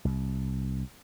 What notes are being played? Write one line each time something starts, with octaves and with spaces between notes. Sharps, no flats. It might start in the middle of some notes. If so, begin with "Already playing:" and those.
C2